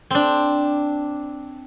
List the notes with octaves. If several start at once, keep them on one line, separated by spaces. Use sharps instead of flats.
C4 D4